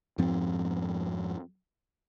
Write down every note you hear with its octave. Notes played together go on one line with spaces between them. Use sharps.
F2 G#2 F3 C4